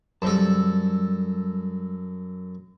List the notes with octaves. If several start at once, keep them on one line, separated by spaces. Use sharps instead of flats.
F#2 G3 A4 C5 A5